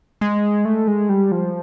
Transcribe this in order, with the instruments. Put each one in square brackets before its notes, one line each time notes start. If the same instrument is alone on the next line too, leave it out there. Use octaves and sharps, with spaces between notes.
[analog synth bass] G#3
A3
G#3
G3
F3